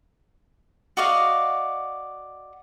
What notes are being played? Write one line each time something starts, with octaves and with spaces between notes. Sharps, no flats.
F#4 D5 D#5 F5